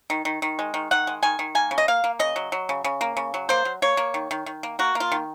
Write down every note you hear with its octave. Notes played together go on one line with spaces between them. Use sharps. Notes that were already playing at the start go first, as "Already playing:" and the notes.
D#3
D#3
D#3
G#3
D#3
D#3 F#5
G#3
D#3 G#5
D#3
A#3 G#5
C#3
D#5
A#3 F5
A#3
C#3 D#5
F#3
F#3
C#3
C#3
A#3
C#3
F#3
A#3 C5
F#3
A#3 C#5
A#3
D#3
D#3
D#3
A#3
A#3 F#4
A#3
F4
D#3